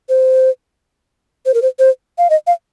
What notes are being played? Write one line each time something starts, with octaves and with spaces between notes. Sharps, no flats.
C5
C5
A#4
C5
C5
F5
D#5
F5